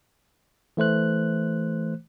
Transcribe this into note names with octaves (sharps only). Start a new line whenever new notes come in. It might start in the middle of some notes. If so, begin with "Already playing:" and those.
E3 A3 C5 F#6